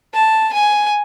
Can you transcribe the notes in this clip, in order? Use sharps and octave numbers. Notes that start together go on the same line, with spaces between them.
A5
G#5